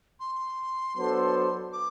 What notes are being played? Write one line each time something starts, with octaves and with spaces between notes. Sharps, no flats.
C6
F#3 B3 D4 A4 C5
D6